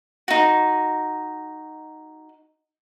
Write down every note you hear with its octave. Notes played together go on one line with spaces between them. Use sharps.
D#4 F#4